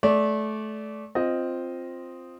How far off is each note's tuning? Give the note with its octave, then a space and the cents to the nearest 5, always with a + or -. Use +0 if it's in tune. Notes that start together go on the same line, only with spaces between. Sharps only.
A3 -25 D5 -20
C4 +0 F4 +0 D#5 +0